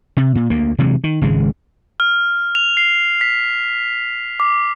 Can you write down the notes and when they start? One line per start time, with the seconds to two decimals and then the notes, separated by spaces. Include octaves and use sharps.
0.17 C3
0.35 A#2
0.50 D2 A#3
0.78 C3 E3 F#3 G#3
1.04 D#3
1.22 G#1 C#3 G#3
2.00 F6
2.55 F7
2.77 C7
3.21 B6
4.40 D6